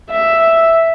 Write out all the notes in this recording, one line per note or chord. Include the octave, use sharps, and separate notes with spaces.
E5